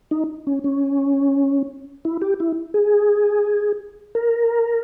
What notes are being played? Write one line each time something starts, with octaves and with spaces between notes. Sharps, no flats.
D#4
C#4
C#4
E4
G4
E4
G#4
A#4